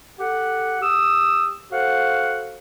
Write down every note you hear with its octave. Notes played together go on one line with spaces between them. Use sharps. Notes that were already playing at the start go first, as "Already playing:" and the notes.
G4 A4 F#5
G4 D#6 E6
F#4 A4 C5 F5 F#5